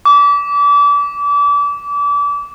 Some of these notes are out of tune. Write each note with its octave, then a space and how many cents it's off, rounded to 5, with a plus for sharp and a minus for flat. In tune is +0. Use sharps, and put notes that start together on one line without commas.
D6 -35